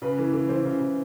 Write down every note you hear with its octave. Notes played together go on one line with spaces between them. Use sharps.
C#3 B4
E3
E3
E3 C5
C#3
C#3